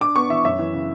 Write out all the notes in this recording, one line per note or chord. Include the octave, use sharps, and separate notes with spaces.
D4 D6
B3 C#6
E3 E5
F#2 E5
E3
C#3